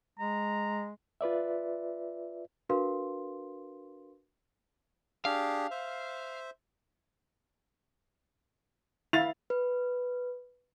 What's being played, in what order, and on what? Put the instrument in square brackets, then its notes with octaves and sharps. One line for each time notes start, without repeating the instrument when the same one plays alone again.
[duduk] G#3 [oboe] A#5
[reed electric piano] F4 B4 D5 E5
[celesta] D4 F#4 A#4 B4 F5 C6
[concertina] D4 G4 G#4 [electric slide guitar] F5
[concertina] C5 E5
[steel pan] E4 [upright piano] F5 A6 F7
[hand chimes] B4